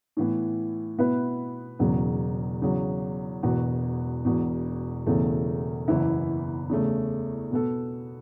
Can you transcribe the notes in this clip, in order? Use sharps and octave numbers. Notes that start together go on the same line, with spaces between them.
A2 E3 B3
B2 B3 E4 B4
E1 E2 C#3 F#3
E2 C#3 F#3
E1 E2 B2 B3 F#4
E1 E2 B2
E1 E2 C#3 A3
F#1 E2 E3 B3 E4
E2 C#3 A3
B2 B3 A4